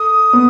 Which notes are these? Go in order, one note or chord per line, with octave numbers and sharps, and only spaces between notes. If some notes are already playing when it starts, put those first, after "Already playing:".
Already playing: A4 D#6
B3